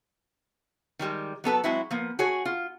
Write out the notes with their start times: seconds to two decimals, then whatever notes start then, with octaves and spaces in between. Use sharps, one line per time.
0.99 D#3 F3 G3 G#3
1.44 F#3 B3 A4 B4
1.64 F#3 G#3 C4 E4 F#4
1.91 F3 A#3 B3
2.19 F#4 G#4 C#5
2.45 F4